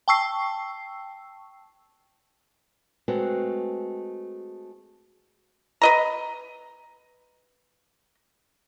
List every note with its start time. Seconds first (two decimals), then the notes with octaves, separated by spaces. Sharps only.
0.08 G5 A5 C#6 E6 C7
3.08 G#3 A3 C4 F#4 B4
5.82 B4 D#5 A#5